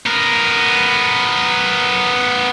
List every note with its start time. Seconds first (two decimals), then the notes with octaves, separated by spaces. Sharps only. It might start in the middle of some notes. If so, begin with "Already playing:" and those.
0.06 B3 A#4